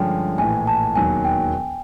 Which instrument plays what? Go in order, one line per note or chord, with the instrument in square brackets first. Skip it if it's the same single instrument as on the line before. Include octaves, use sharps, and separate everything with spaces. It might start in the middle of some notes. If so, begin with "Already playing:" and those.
Already playing: [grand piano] G2 D3 F3 G#3 C#4 [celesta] G5
[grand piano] A#1 A2 E3 [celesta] G#5
[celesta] A5
[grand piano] E1 D#2 D#3 F#3 [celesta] G#5
[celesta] G5